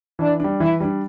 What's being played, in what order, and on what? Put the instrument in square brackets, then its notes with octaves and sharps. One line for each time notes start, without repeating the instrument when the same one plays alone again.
[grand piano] E3 [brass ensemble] D4
[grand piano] G3 D4
[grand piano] E3 [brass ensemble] E4
[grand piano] G3 D4